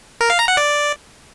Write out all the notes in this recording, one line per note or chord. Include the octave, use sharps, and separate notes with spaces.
A#4
F5
A#5
F#5
D5